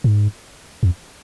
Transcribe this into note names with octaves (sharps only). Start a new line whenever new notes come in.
G#2
F2